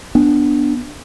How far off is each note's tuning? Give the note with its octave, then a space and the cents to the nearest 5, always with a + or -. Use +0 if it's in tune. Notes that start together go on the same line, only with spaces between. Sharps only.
B3 +0 D4 +0